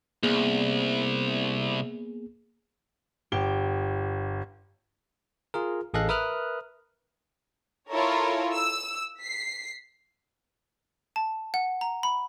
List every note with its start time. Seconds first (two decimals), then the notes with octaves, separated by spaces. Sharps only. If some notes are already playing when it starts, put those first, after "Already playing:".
0.23 C2 A#3 B3 G#4
3.32 G1 G4 G7
5.54 F4 G#4 A#4
5.94 A1 G#4 A4 D#5 F5 F#6
6.09 A#4 B4 E5 D#6 F6 F#6
7.90 E4 F4 A4 A#4 C#5
8.55 E6
9.19 B6 C7
11.16 A5
11.54 F#5
11.81 A#5
12.03 B5